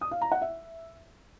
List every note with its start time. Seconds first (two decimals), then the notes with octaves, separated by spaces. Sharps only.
0.01 D#6
0.11 F5
0.22 A#5
0.32 F#5
0.42 E5